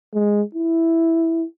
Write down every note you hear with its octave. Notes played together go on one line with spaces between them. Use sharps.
G#3
E4